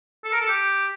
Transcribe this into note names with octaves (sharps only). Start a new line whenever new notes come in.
A4
A#4
A4
G4